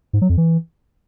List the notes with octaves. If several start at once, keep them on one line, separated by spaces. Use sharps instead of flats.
G#2
F#3
F2
E3